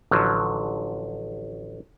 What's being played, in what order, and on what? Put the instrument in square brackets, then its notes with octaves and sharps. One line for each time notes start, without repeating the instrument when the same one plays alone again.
[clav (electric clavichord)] A1 D3 F3 F#3